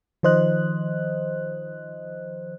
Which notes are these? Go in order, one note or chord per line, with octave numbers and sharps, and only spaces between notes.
D#3 F3 C5 D#5 F#6